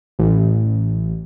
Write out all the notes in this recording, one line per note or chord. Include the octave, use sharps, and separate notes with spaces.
A1